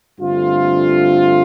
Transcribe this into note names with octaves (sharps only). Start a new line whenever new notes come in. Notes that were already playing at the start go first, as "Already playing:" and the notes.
G2 D3 A3 C4 F4